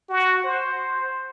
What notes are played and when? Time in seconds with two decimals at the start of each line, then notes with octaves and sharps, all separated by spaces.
0.09 F#4
0.44 C5